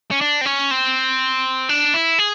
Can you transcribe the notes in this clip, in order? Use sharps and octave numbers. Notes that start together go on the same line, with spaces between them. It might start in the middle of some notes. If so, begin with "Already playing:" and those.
C#4
D4
C4
C#4
C4
D4
E4
G#4